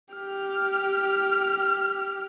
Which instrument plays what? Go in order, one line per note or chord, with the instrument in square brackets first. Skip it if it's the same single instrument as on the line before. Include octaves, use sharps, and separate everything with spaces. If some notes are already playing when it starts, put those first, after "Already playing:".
[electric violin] G4 F6